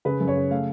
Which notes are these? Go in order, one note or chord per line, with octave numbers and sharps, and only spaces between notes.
C#3 B4
F#2
C#5
C#3
A3 F5